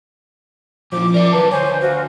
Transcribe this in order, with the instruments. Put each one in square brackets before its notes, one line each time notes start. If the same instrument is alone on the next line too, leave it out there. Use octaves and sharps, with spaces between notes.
[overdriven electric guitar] A#2 E3 [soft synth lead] F3 [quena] D6
[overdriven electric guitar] A#4 E5 [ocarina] D5
[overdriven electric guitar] D#3 F#3 [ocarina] B4 [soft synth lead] A5
[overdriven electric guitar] D2 [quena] C5 [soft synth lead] C#5 [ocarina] G#5
[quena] F#4 [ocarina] C5 [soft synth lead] F5